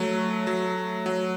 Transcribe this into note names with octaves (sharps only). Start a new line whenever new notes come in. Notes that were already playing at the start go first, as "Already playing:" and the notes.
Already playing: F#3 A3
F#3
F#3